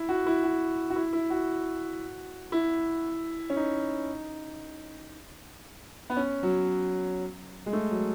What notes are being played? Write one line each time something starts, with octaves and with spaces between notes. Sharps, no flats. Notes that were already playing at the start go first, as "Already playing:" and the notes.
Already playing: E4
F#4
E4
F#4
F#4
E4
E4
F#4
E4
C#4
D#4
B3
C#4
F#3
G#3
A3
F#3